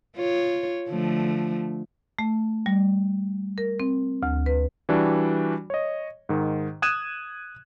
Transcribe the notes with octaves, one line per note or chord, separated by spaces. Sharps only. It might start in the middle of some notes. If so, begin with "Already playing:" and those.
F4 C#5
D3 F3 A3
A3
G3
A#4
C4
D2
B4
E3 G3 D4 F#4
C#5 D#5
G#2 D#3
D#6 F#6 G#6 D#7 E7